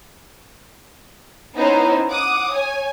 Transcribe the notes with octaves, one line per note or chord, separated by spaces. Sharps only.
B3 C#4 D#4 E4 C5
F#5 D6 D#6
C#5 G#5